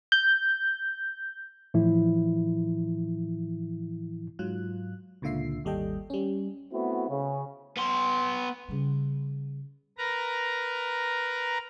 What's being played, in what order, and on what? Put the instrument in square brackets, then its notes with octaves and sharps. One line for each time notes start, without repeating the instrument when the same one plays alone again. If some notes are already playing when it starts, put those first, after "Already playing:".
[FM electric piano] G6
[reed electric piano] A2 E3 F3 E4
[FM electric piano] G#2 F#3 F4 F#6
C#2 A#2 D3 F4 E5 C7
G#1 D#2 G3 A4 D#5 G5
G3 C#4
[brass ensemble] A3 B3 C4 E4 F#4
C#3
[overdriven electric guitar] B3 C6
[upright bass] C#3 G3
[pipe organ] A#4 B4 A#5